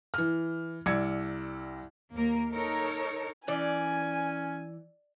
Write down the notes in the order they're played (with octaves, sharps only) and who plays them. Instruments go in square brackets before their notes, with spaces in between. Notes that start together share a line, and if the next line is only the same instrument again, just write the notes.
[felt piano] E3 F6
C2 D5 E6 G#6 C#7
[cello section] D#2 A#3 A#4
D#4 A4 A#4 C#5
[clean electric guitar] E3 [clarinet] C#4 [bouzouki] D5 [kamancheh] G#5